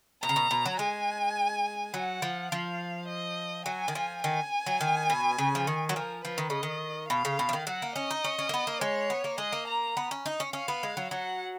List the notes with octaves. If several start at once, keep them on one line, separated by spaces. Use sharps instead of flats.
B2 A#5
C#3
B2
B2
F#3
G#3 G#5
F#3 F#5
F3
F3 F5
D#5
F#3 G#5
D#3
F3
D#3 G#5
F#3
D#3
B2
C#3
F3
D#3
F#3
F3 A#4
F3 B4
D#3
C#3 D#5
D#3
B2 F5
C#3
B2
F3
D#3
F#3 F#5
A#3
C#4 D#5
D#4
C#4
C#4
A#3
B3
A#3
G#3 C#5
B3
A#3
G#3 D#5
A#3
A#5
B3
C#4
D#4
C#4
C#4 F5
B3
G#3
F#3
F#3 F#5